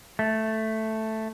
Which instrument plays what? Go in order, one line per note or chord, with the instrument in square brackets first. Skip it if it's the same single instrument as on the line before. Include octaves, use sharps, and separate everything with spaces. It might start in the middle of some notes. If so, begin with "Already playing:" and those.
[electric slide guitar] A3